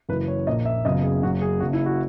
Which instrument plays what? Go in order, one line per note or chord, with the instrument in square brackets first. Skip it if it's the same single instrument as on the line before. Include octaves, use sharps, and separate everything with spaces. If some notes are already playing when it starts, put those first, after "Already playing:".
[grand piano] F#1 F#2 C#3 E3 B4
C#5
A#1 A#2 A#3 D#5
E5
F#1 F#2 C#3 F#3 B3 D#5
G#4
F#1 F#2 C#3 F#4
G#4
F#1 F#2 C#3 F#4
E4
F#4